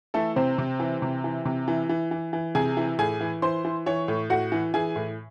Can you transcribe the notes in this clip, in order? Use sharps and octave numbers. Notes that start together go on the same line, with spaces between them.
E3 A3 A4
C3 C4 C5
C3
E3
C3
E3
C3
E3
E3
E3
E3
C3 G#4 G#5
E3
A2 G#4 G#5
E3
E3 C5 C6
E3
E3 C#5 C#6
A2
A2 F#4 F#5
E3
E3 G#4 G#5
A2